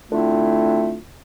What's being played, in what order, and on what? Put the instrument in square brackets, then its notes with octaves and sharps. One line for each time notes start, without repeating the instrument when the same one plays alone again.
[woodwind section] D3 A3 C4 E4 F4